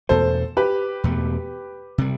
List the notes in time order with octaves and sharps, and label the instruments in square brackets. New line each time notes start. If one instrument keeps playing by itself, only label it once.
[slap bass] E2 B2 A3 [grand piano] A4 C5
[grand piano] G4 B4
[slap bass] E2 B2 A3
C3 G3